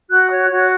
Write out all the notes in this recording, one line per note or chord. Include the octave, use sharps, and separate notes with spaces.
F#4 F#6
C#5
F#6
F#4 G#6
F#6